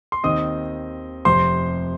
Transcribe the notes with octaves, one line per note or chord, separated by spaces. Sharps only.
C6
D#2 D#3 C4 D#5 D#6
F1 F2 C3 C5 C6